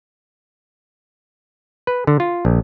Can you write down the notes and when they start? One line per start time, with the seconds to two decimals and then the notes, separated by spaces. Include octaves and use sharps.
1.87 B4
2.07 D3
2.20 F4
2.45 A#1